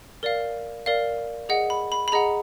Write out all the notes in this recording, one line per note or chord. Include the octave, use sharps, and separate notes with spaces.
A#4 D5 F5
A#4 D5 F5
G#4 D#5 F#5
B5
B5
B5
G#4 D#5 F#5 A#5